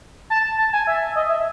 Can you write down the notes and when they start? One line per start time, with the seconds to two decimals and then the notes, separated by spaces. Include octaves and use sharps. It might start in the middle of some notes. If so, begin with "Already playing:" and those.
0.30 A5
0.58 A5
0.73 G#5
0.87 E5
1.16 D#5
1.29 E5